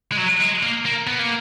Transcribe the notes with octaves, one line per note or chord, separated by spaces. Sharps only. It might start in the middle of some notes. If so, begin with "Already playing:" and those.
G#3
F#3
G#3
A#3
A#3
B3
A#3